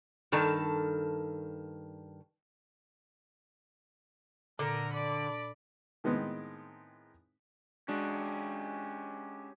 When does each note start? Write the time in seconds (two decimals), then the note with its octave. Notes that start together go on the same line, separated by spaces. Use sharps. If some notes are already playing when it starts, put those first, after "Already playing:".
0.32 G2 D#3 A4 A5
4.59 A#2 D3 A#4 A#5
4.93 D5 B5
6.04 A2 D#3 G#3 B3 C4 D#4
7.88 G#3 C#4 D4 F#4 G4